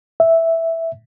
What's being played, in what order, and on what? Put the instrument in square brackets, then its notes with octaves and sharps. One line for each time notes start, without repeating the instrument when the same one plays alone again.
[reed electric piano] E5